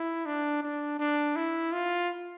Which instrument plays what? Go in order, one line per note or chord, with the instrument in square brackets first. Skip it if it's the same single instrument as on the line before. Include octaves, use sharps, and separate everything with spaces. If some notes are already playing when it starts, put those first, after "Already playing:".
Already playing: [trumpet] E4
D4
D4
D4
E4
F4